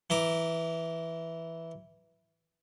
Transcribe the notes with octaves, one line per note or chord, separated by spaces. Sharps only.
E3 E4 A#5 D6